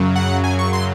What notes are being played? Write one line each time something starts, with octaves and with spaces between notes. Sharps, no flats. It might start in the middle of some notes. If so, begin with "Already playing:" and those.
Already playing: F#2 C#3 F#3
F#5
G#5
C#6
C6